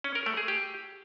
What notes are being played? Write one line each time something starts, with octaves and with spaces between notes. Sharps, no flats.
C#4
A#4
A3
G#4
G4